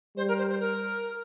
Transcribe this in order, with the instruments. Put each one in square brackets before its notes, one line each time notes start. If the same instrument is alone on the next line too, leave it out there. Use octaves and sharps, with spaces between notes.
[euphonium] G3 [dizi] C5
[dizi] A#4
C5
C5
A#4